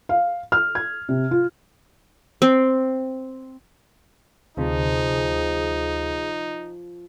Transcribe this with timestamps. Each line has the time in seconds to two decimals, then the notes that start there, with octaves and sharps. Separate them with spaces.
0.09 F5
0.52 F6
0.75 G#6
1.09 C3
1.31 F4
2.42 C4
4.57 D2 C3 F3 D#4 G#4